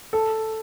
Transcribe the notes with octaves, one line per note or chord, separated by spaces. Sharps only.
A4